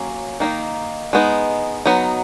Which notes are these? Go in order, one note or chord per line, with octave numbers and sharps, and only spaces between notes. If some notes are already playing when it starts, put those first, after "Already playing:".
Already playing: F#3 A#3 C#4
D#3 A#3 D#4
G#3 B3 D#4
F#3 B3 D#4